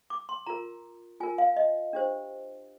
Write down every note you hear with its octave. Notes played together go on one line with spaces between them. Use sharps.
D6
C6
F4 A#4 A#5
F4 A#4 G#5
F5
D#5
D4 G4 C5